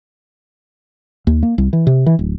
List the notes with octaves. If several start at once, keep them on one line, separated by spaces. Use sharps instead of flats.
D#2
A#3
C2
E3
C3
E3
D1